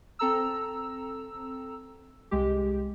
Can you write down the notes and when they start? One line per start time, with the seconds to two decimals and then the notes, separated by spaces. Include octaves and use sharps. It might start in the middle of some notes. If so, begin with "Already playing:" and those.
0.19 C4 A4 A#5 E6
2.31 C2 G#3 G4